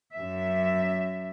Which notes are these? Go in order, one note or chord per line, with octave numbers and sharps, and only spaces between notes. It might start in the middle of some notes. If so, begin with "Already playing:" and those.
F#2 E5